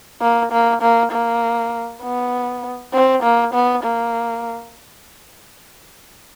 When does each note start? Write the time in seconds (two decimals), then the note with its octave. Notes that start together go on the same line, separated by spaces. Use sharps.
0.22 A#3
0.52 A#3
0.82 A#3
1.12 A#3
2.03 B3
2.94 C4
3.23 A#3
3.54 B3
3.84 A#3